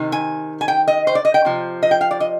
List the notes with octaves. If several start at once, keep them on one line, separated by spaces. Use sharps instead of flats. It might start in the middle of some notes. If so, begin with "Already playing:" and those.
Already playing: C3 D#3
G#5
G#5
G5
D#5
C5
D5
D#5
G5
C3 F3
D#5
G5
F5
D5
D#5